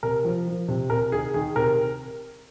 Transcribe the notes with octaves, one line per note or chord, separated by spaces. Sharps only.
C3 A#4
F3
F3
C3
C3 A#4
D#3 G#4
D#3 G#4
C3 A#4